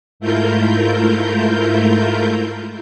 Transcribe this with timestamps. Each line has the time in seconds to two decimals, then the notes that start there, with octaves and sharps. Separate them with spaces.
0.20 G#2 A3 E4 F4 A#4 G6